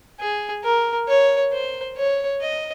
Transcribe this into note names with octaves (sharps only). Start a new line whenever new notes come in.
G#4
A#4
C#5
C5
C#5
D#5